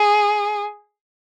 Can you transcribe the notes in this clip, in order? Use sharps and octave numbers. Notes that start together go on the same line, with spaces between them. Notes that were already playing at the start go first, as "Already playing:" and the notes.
Already playing: G#4